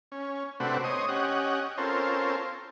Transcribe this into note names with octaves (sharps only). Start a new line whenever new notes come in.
C#4
C3 A3 C4 D4 F#4 B4
C5 C#5 D#5 D#6
C#4 G4 D#5 F#5
C4 C#4 F4 A4 A#4 C5